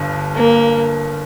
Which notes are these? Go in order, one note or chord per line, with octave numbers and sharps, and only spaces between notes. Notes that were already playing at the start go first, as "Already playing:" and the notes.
Already playing: G1 G2
A#3